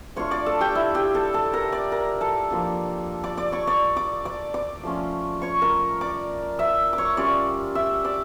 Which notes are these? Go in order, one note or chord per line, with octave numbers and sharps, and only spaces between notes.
A3 D4 F4 C#5 C#6
D5 D6
A4 A5
G4 G5
E4 E5
G4 G5
A4 A5
A4 A5
A#4 A#5
D5 D6
A#4 A#5
A4 A5
F3 A#3 D4
D5 D6
D5 D6
C#5 C#6
D5 D6
D5 D6
D5 D6
D5 D6
F3 A3 C#4 F4
C#5 C#6
A#4 A#5
D5 D6
E5 E6
D6
C#5 C#6
G3 C#4 F4 D5 D6
E5 E6
D5 D6